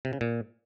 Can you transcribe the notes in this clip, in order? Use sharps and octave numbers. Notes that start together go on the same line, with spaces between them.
C3
C#3
A#2